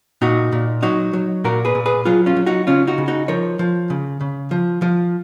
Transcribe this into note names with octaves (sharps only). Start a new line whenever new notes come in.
A#2 D#4 F#4
A#2
F#3 D#4 F#4
F#3
A#2 F#4 A#4
G#4 B4
A#2
G#4 B4
F#3 F4 G#4
C#4 F4
F#3
D#4 F#4
C#3 C#4 F4
D#4 F#4
C#3
D#4 F#4
F3 A#4 C#5
F3
C#3
C#3
F3
F3